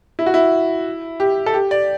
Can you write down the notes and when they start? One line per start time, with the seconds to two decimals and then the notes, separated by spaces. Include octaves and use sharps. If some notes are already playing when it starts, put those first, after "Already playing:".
0.19 E4
0.26 F#4
0.34 E4
1.20 G4
1.46 A4
1.54 G4
1.71 D5